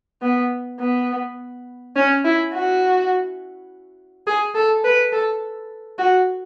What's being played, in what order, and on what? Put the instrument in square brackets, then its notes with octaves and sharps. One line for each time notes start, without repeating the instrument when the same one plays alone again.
[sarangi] B3
B3
C#4
E4
F#4
G#4
A4
B4
A4
F#4